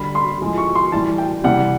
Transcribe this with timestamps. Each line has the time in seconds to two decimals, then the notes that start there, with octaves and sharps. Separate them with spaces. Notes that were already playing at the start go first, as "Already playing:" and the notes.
Already playing: D3 G3 B5
0.15 C6
0.41 A2 F3 G#3
0.58 C#6
0.75 C6
0.92 A2 E3 G3 A5
1.18 G5
1.44 C3 E3 G3 F#5